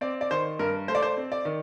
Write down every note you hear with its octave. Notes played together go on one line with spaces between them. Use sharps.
C4 D5
D5
D#3 C5
G2 A#4
A3 C5
D5
C5
C4
D5
D#3